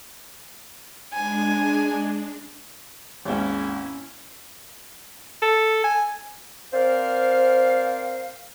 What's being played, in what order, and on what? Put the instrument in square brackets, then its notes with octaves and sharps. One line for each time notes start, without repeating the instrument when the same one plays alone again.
[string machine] G#3 D4 [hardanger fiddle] G#5
[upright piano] G#1 D#2 G#2 [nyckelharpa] C#4 E4
[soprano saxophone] A4
G#5
[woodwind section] C4 A#4 C5 D5 F5